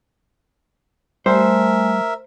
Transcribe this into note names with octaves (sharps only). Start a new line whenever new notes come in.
G3 A3 A#4 C5 E5 G#5